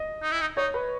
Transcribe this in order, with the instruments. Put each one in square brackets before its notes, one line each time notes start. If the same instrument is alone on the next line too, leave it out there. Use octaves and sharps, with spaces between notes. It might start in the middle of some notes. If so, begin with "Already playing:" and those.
Already playing: [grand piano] D#5
[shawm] D#4
E4
D#4
[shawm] D#4 [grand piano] C#5
[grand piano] B4